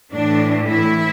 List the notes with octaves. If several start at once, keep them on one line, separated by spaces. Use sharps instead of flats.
A2 E3 D4
E4